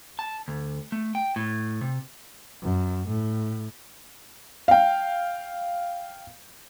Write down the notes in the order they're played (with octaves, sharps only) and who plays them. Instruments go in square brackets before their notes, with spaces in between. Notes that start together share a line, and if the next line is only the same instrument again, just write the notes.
[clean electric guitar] A5
D2
A3
G5
A2
C3
[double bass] F#2
A2
[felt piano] F5 G5